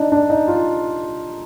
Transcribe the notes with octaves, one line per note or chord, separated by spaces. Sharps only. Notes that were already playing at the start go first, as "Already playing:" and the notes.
Already playing: D4 D#4
D4
D#4
F4